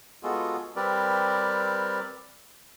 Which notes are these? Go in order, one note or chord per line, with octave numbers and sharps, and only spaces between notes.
G#3 B3 F4 F#4 G#4 A4
G3 C4 G4 A#4 B4 D5